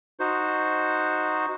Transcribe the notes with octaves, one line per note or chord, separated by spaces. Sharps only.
D#4 F#4 C5